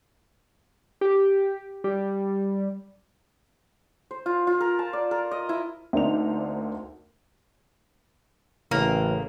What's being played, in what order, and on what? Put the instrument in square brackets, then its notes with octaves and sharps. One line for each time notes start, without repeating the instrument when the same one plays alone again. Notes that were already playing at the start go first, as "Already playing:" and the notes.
[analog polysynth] G4
G3
[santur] C5
F4
F4
A#4
A5
D5
A#4
D#5
E4
[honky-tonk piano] D2 A#3 C4 D4 D#4 F7
[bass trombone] A1 [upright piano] C#3 E4 [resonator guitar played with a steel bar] A#3